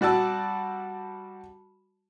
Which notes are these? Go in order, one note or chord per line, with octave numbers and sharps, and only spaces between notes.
G3 F#4 D5 A5 E6